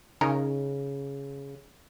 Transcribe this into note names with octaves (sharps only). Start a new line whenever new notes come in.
C#3 C#4 D#4 A#4